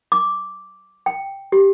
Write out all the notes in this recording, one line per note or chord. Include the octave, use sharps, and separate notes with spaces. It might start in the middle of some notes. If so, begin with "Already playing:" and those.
D6
G5
G4